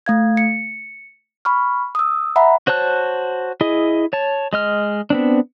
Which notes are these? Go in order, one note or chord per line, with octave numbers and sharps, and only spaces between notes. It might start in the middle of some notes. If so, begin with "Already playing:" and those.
A3 F5 G#6
C#7
B5 C#6 F6
D#6 E6
E5 F#5 A#5 B5
F#4 C5 C#5 A5 F#6
E4 G#4 D#5
C#5 A5
G#3 D#5 F6
B3 C4 D4